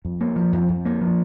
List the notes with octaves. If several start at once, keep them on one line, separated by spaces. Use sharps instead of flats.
F2
A#3
F3
F2
F2
A#3
F3